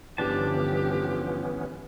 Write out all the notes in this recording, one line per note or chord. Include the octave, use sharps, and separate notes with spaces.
G1 E3 F3 B3 C#4 D4 G4 A5